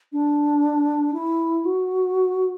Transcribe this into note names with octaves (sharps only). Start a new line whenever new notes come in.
D4
E4
F#4